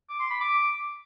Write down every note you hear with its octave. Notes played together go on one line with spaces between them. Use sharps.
D6
C6
B5
D6